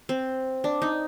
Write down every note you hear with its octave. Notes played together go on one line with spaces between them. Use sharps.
C4
D4
D#4